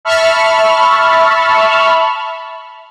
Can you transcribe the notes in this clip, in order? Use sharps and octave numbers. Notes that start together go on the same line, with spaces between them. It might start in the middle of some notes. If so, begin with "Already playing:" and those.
E5 A5 B5 C#6 F6